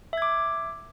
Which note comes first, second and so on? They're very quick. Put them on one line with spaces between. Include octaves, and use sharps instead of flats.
E5 G#6 D6